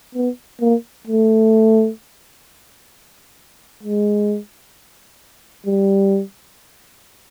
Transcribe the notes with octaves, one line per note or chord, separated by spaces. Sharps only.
B3
A#3
A3
G#3
G3